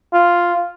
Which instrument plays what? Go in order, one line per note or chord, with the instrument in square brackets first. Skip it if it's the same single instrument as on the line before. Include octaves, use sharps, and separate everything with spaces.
[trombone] F4